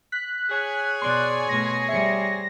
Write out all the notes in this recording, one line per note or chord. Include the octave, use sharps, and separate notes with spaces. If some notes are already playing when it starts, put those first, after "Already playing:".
F#6 B6
G#4 C#5 G#5
B2 D5 C6
B2 A3 A#6
G3 C5 E5 C#7